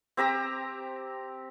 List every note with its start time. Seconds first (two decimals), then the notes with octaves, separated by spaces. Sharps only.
0.17 C4 G4 A#5 E6